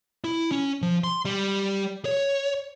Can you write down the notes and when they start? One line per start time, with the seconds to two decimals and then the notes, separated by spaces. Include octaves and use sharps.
0.24 E4
0.52 C#4
0.82 F3
1.04 C6
1.25 G3
2.05 C#5